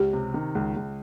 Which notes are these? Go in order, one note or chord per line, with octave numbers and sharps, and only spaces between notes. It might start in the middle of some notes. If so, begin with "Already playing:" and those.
Already playing: C#2 G4
C3
D#3
C#2
C#2